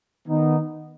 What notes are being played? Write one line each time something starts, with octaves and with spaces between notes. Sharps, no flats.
D#3 B3 D#4